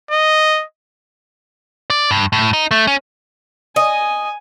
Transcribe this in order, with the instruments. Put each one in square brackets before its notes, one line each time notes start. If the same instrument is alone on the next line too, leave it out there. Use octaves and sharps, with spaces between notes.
[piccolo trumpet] D#5
[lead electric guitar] D5
G2
A2
D#4
A3
C#4
[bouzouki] D#5 [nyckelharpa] G#5